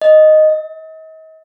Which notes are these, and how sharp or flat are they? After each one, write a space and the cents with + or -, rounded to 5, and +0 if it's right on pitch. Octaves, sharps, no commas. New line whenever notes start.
D#5 -5
D#5 +40